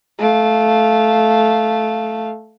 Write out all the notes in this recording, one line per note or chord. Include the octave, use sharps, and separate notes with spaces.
A3 F5